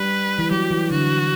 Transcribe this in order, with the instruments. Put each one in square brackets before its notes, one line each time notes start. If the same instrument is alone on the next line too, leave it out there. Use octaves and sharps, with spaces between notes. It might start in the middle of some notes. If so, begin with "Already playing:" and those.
Already playing: [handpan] G3 [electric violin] B4
[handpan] E3
[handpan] F#3 [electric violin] G4
[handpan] E3
[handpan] D3 [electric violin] F#4